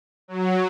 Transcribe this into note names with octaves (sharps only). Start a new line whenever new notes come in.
F#3